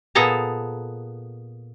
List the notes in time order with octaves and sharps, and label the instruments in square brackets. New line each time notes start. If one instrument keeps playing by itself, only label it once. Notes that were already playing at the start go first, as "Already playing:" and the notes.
[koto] A#2 B3 G#4 A4 A5 A#5